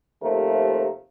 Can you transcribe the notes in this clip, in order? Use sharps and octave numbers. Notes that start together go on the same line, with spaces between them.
D#2 C3 F3 A3 A#4